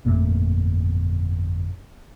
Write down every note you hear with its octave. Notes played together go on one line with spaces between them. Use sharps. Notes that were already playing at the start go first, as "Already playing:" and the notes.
G1 F2 A#2 A3